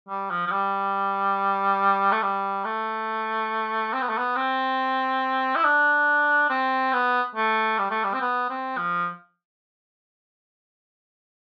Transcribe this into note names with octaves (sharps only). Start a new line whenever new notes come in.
G3
F3
F3
G3
A3
G3
A3
C4
B3
A3
B3
C4
E4
D4
C4
B3
A3
G3
A3
G3
C4
B3
C4
F3